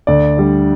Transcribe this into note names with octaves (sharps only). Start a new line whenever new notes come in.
D2 D5
D3 G3